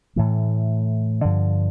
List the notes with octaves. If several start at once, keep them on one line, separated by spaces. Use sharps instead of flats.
A2 E3 A3
G2 D3 F3